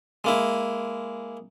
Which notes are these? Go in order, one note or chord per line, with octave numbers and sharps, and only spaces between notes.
G#3 A#3 E4